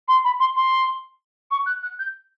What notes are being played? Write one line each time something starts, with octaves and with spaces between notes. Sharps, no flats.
C6
B5
C6
C6
C#6
F#6
F#6
G6